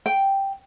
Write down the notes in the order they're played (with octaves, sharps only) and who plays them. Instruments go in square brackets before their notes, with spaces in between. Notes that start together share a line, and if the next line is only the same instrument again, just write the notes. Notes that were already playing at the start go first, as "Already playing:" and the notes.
[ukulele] G5